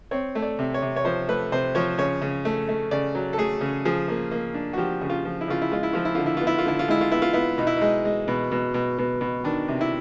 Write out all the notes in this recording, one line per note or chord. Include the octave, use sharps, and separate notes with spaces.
C4 C#5
A3
D5
C3
C#5
C3
C#5
F3 C5
A3 B4
C3 C5
F3 C#5
C#3 C#5
C#3
A3
A3
C#3 D5
F#3
A4
A3 G#4
C#3
F3 G#4
A#3
A#3
D4
F#4
F3 G4
C#3
F4
F3
E4
C#3 F4
E4
G#3 F4
E4
F3 F4
E4
D3 F4
E4
B3 F4
E4
F4
D3 E4
F4
G#3 E4
F4
B3 E4
F4
B3 E4
B2 D#4
E4
G#3 D#4
G#3
B2
B2
B2
B2
B2
D#3 D4
C3
E4